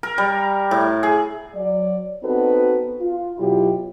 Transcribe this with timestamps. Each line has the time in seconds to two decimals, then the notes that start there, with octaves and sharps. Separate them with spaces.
0.03 A#4
0.18 G3
0.71 A2
1.03 G#4
1.54 F#3 D5
2.23 B3 C4 D#4 F#4 A4 B4
3.01 F4
3.38 B2 F#3 E4 F4 G4